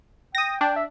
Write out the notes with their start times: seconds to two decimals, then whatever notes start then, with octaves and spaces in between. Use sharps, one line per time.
0.35 G5 D#6 A#6
0.61 D4 G5
0.76 E5